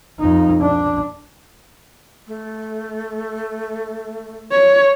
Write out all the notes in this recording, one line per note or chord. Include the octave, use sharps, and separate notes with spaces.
F2 D#4
D4
A3
C#5